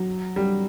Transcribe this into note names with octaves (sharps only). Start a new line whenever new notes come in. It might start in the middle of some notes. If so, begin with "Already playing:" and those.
Already playing: F#3
G3